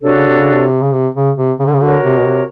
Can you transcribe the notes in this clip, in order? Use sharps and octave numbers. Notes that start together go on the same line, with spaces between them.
C3 D4 F#4 A4 C#5
C#3
C3
C#3
C3
C#3
C3
C#3
C3
C#3
D3
C#3
D3 F#4 A#4 C#5
C3
B2
C3